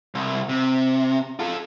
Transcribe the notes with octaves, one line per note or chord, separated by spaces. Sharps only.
C2
C3
F4 A4